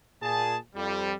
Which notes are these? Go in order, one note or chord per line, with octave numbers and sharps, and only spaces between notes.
A#2 G#4 A5
F2 G3